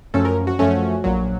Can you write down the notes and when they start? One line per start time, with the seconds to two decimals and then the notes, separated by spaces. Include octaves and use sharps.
0.14 F#2 F3 A3 C#4 A4
0.25 A#4
0.47 F#4
0.59 F#2 F3 A3 C#4
1.04 A#1 A#2 F#3